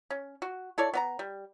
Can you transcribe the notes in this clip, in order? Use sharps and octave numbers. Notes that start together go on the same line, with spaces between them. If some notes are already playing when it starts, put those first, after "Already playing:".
C#4
F#4
E4 A4 C#5 D5
B3 D5 A#5
G3